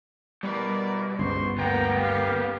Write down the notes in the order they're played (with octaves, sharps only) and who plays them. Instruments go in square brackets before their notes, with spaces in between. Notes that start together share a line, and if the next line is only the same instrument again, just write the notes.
[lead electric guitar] B2 [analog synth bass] G3 [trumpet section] E4 A#4 D5
[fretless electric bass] G1 [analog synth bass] C#2 [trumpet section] C5 C6 C#6
[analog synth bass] D2 [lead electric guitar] A#3 B3 [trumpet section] F#5 G5 A#5
[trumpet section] G4 F5